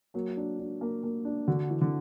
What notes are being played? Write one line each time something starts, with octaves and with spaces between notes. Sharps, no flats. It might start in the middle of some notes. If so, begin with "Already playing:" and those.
F#3 A#3
D4
D4
A#3
A#3
D4
D3 F#4
E3
D3